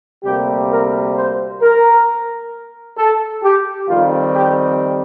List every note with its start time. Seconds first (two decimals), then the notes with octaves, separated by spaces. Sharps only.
0.23 D2 C3 G3 A#3 G4
0.69 A#4
1.15 C5
1.61 A#4
2.97 A4
3.43 G4
3.88 F2 D#3 G3 C4 F4
4.34 G4